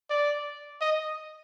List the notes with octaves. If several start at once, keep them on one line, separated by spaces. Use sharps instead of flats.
D5
D#5